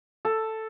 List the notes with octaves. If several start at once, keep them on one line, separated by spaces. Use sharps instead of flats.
A4